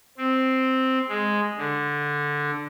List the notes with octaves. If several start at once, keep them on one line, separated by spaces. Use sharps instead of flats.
C4
G#3
D3